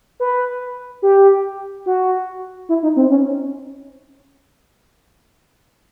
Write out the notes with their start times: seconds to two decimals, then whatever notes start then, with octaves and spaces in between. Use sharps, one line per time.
0.20 B4
1.02 G4
1.86 F#4
2.69 E4
2.83 D#4
2.96 C4
3.10 C#4